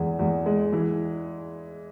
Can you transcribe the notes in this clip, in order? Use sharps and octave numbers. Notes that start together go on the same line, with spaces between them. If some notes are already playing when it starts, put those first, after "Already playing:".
Already playing: E2 G#3
E2
G#3
E3